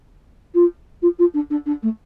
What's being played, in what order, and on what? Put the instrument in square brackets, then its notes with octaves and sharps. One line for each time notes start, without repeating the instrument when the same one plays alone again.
[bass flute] F4
F4
F4
D4
D4
D4
A3